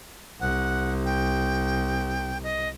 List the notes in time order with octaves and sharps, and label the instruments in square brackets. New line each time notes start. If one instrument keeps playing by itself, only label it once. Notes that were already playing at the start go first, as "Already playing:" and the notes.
[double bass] C2 [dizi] F#5
[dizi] G5
D#5